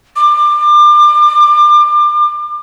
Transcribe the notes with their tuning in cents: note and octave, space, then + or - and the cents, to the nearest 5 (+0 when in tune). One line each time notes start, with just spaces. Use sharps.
D6 +30